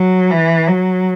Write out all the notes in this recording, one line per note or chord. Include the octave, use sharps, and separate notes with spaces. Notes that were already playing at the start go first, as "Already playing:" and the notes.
Already playing: F#3
E3
F#3